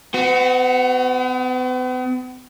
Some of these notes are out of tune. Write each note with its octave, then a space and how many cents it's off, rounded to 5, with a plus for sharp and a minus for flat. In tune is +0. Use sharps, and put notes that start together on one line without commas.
B3 +45 F#4 +0